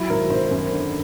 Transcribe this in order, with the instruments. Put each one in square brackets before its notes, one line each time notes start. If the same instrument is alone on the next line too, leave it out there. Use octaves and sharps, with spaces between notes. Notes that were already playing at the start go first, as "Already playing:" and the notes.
Already playing: [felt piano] F#3 E4
G#1 A#4
G#1 C5
F#2
D3